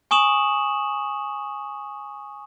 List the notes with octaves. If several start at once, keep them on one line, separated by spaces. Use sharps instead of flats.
G#5 C#6 D#6 E7 F#7